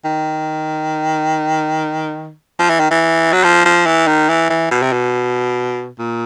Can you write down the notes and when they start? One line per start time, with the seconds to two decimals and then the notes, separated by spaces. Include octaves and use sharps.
0.05 D#3
2.59 F3
2.70 E3
2.80 D#3
2.91 E3
3.33 F#3
3.44 F3
3.65 F3
3.86 E3
4.07 D#3
4.29 E3
4.50 E3
4.71 B2
4.82 C3
4.93 B2
5.99 A#2